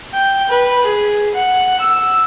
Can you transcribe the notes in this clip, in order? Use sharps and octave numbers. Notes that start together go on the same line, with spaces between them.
G5
B4
G#4
F#5
E6